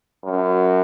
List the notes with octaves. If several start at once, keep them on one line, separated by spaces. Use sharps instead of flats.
F#2